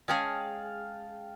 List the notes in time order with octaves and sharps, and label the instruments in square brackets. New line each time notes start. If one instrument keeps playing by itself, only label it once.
[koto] G#3 C#4 G#4 [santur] F5 G5 A5